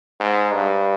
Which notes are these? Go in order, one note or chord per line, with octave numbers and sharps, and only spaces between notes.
G#2
G2